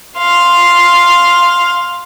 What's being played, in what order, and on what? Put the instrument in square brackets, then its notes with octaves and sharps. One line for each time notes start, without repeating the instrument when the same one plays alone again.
[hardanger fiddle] F5 C6